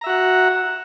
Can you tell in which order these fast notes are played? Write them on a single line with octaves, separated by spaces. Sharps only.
A#5 E5 F#4 F#5